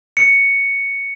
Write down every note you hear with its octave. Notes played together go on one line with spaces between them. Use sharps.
C#7